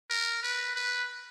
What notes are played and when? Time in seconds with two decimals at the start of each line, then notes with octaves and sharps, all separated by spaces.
0.10 A#4
0.43 B4
0.76 B4